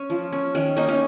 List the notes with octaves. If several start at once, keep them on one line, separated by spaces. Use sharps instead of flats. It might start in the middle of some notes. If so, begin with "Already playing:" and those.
Already playing: C#4
F3
C#4
D#3 C#4
A#3 C#4 D#4
C#4